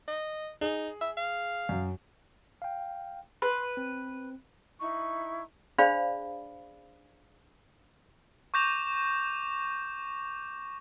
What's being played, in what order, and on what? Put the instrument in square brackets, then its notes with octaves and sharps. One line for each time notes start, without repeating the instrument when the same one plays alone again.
[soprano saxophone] D#5
[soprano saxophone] D#4 [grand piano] G#4
[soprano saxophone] E5
F5
[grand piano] F#2
[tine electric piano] F5 G5
[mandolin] B4 [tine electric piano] C6
[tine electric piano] C4
[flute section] D#4 E4 C#6
[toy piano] D4 G#4 C5 D5 F5 B5
[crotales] C#6 D6 G6 A#6 E7 F7